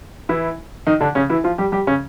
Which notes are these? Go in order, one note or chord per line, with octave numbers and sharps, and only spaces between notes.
E3 E4
D#3 D#4
D3 D4
C#3 C#4
E3 E4
F3 F4
G3 G4
G3 G4
C#3 C#4